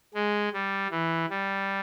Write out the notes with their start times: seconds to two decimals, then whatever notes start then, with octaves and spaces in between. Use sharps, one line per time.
0.14 G#3
0.53 G3
0.91 E3
1.30 G3